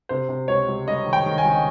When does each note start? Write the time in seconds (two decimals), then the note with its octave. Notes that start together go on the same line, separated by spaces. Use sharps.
0.09 C3 C5
0.29 C3
0.48 C#2 C#5
0.68 C#2
0.87 G3 D#5
1.07 D#3
1.13 G5
1.26 D#3
1.38 G#5
1.45 C#2